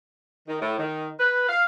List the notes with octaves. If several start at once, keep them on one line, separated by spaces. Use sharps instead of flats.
D#3
A2
D#3
B4
F5